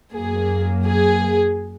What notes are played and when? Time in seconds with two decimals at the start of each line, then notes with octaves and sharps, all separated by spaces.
0.13 F#2 F#3 A#3 G#4
0.86 G#4